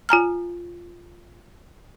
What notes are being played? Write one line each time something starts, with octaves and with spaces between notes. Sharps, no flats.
F4 G#5 A#5 F6